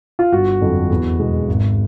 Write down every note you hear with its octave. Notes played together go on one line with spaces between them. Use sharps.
F4
G1 F#4
F2 D3 F#3
E2
B2 G#3
G#1